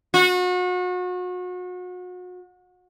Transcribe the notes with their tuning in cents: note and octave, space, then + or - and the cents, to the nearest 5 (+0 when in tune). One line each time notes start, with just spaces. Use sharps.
F#4 -35